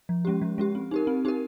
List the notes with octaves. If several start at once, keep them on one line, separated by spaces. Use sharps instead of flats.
F3
G#3 C#4 G4
F3
G#3 C#4 G4
C4
D#4 G4 A#4
C4
D#4 G4 A#4